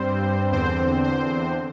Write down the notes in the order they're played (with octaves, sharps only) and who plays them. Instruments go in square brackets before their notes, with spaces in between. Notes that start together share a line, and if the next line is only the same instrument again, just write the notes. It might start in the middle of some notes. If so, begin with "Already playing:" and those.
Already playing: [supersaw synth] G2 G3 C4 C5
E2 D3 C4 C5
C5